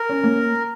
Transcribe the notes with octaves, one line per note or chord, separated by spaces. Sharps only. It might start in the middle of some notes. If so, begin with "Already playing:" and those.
Already playing: A#4
C#4
A#3